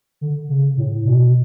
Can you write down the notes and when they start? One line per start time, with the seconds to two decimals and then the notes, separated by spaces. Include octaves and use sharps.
0.21 D3
0.49 C#3
0.77 A2
1.05 B2